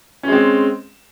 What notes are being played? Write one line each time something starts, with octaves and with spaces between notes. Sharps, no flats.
G#3 C4 C#4